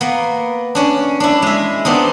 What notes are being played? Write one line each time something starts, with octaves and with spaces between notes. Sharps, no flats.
A#3 B3
C#4 D4
D4 E4
G#3 E5
B3 C4 D4 D#4